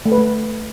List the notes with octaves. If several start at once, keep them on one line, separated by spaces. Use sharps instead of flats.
A3
B4
A3